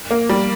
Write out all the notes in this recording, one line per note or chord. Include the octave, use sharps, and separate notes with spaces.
A#3
G3